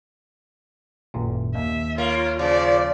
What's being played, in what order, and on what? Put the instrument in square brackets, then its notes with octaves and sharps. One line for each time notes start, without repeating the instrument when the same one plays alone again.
[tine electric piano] G#1 F#2 A#2
[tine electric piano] D#2 [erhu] E5
[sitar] A#3 [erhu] F4 [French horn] C#5
[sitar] C#3 [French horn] F3 [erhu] D5